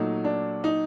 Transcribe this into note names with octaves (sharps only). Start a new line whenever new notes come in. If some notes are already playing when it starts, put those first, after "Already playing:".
Already playing: A#2 F#3 A3 D#4
D4
D#4